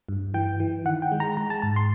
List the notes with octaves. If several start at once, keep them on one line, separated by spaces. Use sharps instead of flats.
G2
E3 G5
E3
D#3 F#5
G5
G#3
A#5
G#3 A#5
A5
G#2 A5
C6